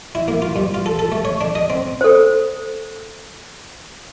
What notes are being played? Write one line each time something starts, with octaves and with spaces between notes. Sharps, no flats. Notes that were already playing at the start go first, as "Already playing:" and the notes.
E4
A#3
F4
G2
F4
A4
A4
A3
C#5
D4
D#5
C4
A4 C5